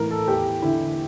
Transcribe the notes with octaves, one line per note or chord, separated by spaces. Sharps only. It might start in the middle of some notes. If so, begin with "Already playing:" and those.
Already playing: A2 E3 A#4
A4
E2 G4
D3 E4